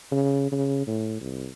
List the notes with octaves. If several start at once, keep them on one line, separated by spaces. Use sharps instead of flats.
C#3
C#3
A2
C2